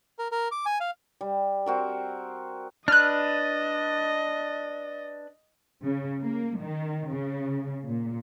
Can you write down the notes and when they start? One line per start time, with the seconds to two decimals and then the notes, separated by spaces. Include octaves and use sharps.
0.19 A#4
0.32 A#4
0.52 D6
0.66 G#5
0.80 F5
1.21 G3
1.66 C4 F#4 A#4
2.88 D4 B4 D#5 F6 F#6
5.85 C#3
6.24 A#3
6.60 D#3
7.10 C#3
7.88 A#2